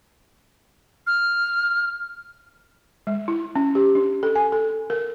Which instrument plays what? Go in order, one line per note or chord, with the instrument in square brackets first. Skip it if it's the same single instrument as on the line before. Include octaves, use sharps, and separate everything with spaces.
[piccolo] F6
[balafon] G#3
E4
C#4
G4
D4
A4
G#5
A4
A#4